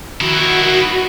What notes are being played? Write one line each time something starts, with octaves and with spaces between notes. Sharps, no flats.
D#3 E4 F#4